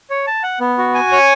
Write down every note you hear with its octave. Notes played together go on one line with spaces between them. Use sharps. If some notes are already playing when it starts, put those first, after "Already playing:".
C#5
A5
F#5
B3
F#4
G#5
C#5